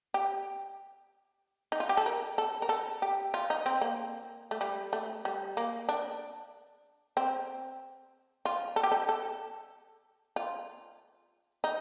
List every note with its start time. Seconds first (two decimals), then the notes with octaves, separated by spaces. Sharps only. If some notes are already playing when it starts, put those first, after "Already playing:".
0.14 G4
1.72 D#4
1.80 F4
1.89 G4
1.97 A4
2.06 A#4
2.38 A4
2.62 A#4
2.69 A4
3.02 G4
3.34 F4
3.50 D#4
3.66 C4
3.81 A#3
4.51 A3
4.61 G3
4.93 A3
5.25 G3
5.57 A#3
5.89 D4
7.17 C4
8.45 F4
8.76 A4
8.83 G4
8.92 A4
9.09 A4
10.36 F4
11.64 D#4